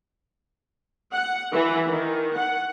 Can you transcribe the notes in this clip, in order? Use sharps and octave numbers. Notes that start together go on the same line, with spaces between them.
F#5
E3
D#3
F#5